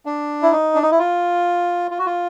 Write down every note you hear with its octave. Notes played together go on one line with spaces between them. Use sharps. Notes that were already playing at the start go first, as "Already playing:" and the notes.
D4
E4
D#4
D4
D#4
E4
F4
F4
F#4
F4